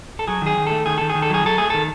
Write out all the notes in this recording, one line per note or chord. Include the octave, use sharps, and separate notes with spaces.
A4
F#3 G#4
D#3 G#4
D#3
A3 A4
D#3 G#4
D#3 A4
G#4
D#3
A4
F#3 G#4
F#3 A4
A3 G#4
D#3 A4